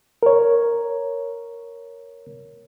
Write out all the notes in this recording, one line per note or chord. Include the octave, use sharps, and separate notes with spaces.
A#4 C#5